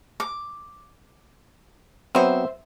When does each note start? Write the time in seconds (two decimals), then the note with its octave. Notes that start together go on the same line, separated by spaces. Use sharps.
0.20 D6
2.15 F#3 B3 C4 C5 E5